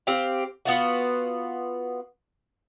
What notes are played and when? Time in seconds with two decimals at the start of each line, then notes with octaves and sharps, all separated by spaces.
0.07 C4 G4 F5
0.65 B3 F4 F#4